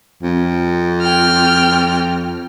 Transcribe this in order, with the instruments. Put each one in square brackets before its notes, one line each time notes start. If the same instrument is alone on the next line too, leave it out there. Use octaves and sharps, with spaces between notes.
[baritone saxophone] F2
[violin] G5 F6